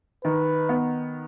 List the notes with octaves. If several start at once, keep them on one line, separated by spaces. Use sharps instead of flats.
D#3 B4
B3